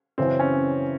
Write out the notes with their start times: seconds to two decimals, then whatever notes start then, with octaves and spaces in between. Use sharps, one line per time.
0.18 F#2 C#3 E3 C4
0.39 C#4